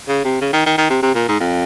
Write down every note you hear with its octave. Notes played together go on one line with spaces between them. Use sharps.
C#3
C3
C#3
D#3
D#3
D#3
C3
C3
A#2
G#2
F2